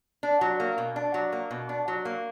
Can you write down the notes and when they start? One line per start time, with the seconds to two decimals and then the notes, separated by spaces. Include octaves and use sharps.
0.23 D4
0.41 F#3
0.60 A#3
0.78 B2
0.96 D4
1.14 F#3
1.32 A#3
1.51 B2
1.69 D4
1.88 F#3
2.05 A#3